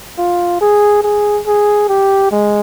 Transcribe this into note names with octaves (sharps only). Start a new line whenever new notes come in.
F4
G#4
G#4
G#4
G4
G#3